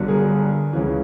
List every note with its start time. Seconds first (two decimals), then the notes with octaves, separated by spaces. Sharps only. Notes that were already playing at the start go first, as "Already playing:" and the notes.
Already playing: G1 G2 D3 F#3
0.08 G#4 A#4
0.73 C#2 C#3 E3